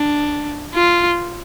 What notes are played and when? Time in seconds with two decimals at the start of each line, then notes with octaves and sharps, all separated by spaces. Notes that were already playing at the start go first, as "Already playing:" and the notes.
Already playing: D4
0.74 F4